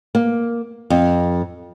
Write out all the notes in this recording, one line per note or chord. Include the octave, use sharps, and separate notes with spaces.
A#3
F2